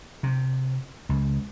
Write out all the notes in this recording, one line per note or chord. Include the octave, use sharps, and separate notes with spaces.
C3
C#2